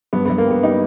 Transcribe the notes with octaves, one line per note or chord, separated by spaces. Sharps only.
G2 B3
B3
G2
A#3
G3 B3
G3 D#4